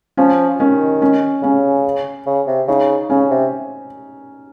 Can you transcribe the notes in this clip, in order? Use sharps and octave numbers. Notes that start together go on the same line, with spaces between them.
F3 C#4
D#3 C#4
C#4
C#3 C#4
C#3
C3
C#3 D#4
C#3 C#4
C3